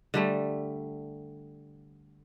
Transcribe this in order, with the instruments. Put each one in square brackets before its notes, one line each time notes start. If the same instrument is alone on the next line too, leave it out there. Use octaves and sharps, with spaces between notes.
[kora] D3 G3 A3